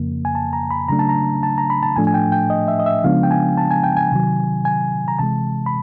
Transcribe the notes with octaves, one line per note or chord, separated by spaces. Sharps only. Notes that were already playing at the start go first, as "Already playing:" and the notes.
Already playing: F2 C#3 F3 A#3
G#5
A5
A#5
B5
C#3 F#3 A3 D4 A#5
A5
A#5
A5
A#5
B5
A5
A2 F3 A3 D4 G#5
G#5
G5
G5
D#5
E5
D#5
E5
C#3 F3 G#3 B3 D4 F5
G5
G#5
A5
G#5
G5
G#5
C3 D#3 F#3
G#5
A#5
C3 E3 G#3 A5
B5